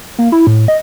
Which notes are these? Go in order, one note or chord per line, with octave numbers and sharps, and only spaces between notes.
A#3
E4
A2
D#5